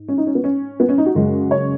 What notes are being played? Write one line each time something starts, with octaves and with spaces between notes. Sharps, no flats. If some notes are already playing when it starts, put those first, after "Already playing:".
Already playing: G#2
C#4
D#4
C#4
B3
C#4
B3
C#4
D#4
F#4
F#2 C#3 G#3
C#5